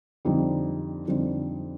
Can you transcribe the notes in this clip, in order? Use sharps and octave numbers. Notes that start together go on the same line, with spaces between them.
F2 D3 G3 C4 D#4
F2 D3 G3 C4 D#4